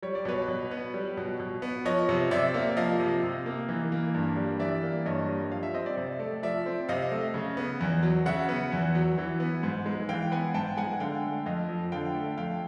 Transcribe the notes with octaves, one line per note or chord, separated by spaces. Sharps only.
G3 C#5
D5
B2 B4 C#5
B2
B3
G3
B2
B2
B3
F3 C#5 D#5
C3
C3 D5 E5
A#3
F3 D#5 F5
C3
C3
A#3
E3
A#3
G2
G3
E3 D5 E5
A#3
G2 C#5 D#5
G3
F3 F5
E5
C4 D#5
D5 E5
C3
A3
F3 D5 E5
C4
C3 D#5 F5
A3
C#3
B3
E2
F#3
C#3 E5 F#5
B3
E2
F#3
E3
B3
G#2
G#3
E3 F5 G5
B3 F#5 G#5
G#2 G5 A5
G#3 F#5 G#5
D3 F5 G5
A3
F2 D#5 F5
F3
D3 F5 G5
A3
F2 F5 G5